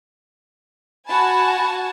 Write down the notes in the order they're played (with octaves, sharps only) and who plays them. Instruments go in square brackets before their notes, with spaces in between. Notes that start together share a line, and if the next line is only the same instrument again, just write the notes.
[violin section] F#4 G#5 A5 [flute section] B5